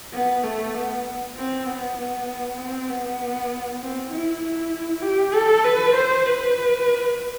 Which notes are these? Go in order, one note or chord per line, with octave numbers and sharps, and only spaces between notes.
B3
A3
B3
C4
B3
B3
C4
B3
C4
E4
E4
G4
A4
B4
C5
B4